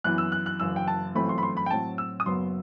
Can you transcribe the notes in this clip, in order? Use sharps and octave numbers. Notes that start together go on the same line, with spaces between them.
F#2 E3 B3 E4 F#6
E6
F#6
F#6
F#1 F#2 E3 E6
G5
A5
G1 F#2 E3 A3 C4 B5
C6
B5
C6
B5
G5
A2 F#3 C4 A5
E6
D#6
F#1 F#2 F#3 B3 C6